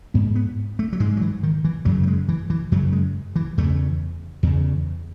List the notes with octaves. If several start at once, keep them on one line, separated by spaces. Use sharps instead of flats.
G#2 B3
B3
A3
F#3
G#2 G#3
F#3
E3
D#3
E3
F#2 C#3 F#3
A3
G#3
E3
E3
F#2 C#3 F#3
G#3
E3
E2 C#3 A3
E2 C#3